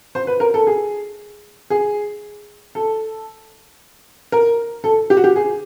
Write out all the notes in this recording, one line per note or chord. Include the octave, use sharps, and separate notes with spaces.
C5
B4
A#4
A4
G#4
G#4
A4
A#4
A4
G4
F#4
G4
G#4